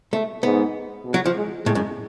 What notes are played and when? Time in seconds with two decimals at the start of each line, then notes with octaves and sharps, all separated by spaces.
0.13 A3
0.43 G#2 B3
1.04 B2
1.14 F#3
1.26 F3
1.35 G#3
1.65 A2 G#3
1.75 F#2